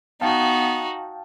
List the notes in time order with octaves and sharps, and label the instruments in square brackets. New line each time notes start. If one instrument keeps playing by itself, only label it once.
[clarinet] B3 [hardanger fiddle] D#4 F#4 [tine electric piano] F5 G5 A5